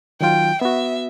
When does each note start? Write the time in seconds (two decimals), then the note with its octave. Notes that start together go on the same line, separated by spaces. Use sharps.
0.21 D#3 F#3 F4 G5
0.61 B3 F#4 E5